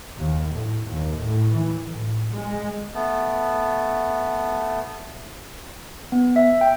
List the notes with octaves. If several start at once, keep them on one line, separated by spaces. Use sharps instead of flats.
D#2
A2
D#2
A2
E3
A2
G#3
A3 B3
B3
E5
G5